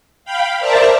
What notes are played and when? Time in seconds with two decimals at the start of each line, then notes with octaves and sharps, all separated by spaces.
0.25 F5 G5 B5
0.60 A#4 C5 D5 E5 A5 A#5